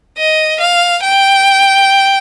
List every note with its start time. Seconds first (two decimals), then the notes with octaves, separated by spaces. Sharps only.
0.18 D#5
0.60 F5
1.03 G5